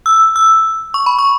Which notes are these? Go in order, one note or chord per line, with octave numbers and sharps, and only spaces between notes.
E6
E6
C#6
B5
C#6